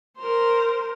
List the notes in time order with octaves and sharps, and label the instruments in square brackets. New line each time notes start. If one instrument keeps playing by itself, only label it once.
[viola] A#4 C5